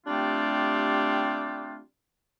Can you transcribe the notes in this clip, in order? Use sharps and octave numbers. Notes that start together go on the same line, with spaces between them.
G3 A3 C4 D4 F4 G4